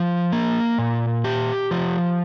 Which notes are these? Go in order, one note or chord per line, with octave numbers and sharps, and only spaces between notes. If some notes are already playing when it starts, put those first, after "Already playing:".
Already playing: F3
A#3
A#2
G4
F3